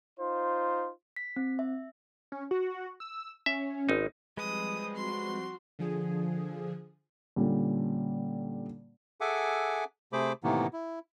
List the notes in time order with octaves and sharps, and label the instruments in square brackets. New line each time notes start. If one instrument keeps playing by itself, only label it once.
[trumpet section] D#4 F4 C5
[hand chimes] B6
C4
E5
[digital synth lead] C#4
F#4
E6
[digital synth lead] C#4 [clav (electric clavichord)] E5
[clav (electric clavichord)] G#1 D#4
[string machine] F3 G3 C4 [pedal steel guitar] G#3 B4 [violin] D#6
[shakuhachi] F#4 [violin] C6
[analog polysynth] D3 F3 G#4
[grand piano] A#2 D3 G3 C#4
[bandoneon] G#4 A4 E5 F#5 G#5 D6
C3 A3 G#4 C5 B5 D6
A2 C3 D#3 E3 A#3 B3
E4